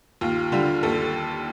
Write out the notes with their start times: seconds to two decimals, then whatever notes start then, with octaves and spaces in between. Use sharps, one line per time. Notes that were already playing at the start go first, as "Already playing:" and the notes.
0.21 D#2 F4
0.52 D3 G3 F4
0.83 D#2 A4